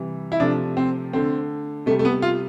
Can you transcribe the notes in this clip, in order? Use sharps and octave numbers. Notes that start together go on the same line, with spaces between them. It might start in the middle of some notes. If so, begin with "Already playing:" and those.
Already playing: C3 E3 G3
E4
C3 F3 A3 D4
C4
D3 A3 C4
C3 G3 A3
A3
B3
F4